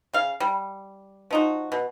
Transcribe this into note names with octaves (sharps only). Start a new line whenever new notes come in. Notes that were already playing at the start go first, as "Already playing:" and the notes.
C#3 F5
G3
F3 D#4 F#4
B2